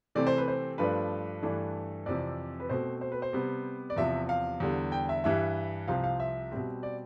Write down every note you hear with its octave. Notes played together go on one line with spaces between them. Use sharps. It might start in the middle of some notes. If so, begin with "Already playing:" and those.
C3 E3 A3 C4 D5
C5
B4
C5
G2 F3 A3 D4 B4
G2 E3 A3 D4
F2 C3 E3 D5
B4
B2 A3 C4 C5
C5
B4
C5
C3 G3 B3
D5
E2 C3 F3 E5
F5
E2 D3 G3
G5
E5
G2 E3 G3 E5
C2 C3 F3 C4 F5
F5
E5
B2 G3 C4
D5